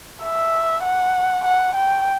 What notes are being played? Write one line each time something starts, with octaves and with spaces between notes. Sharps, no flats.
E5
F#5
F#5
G5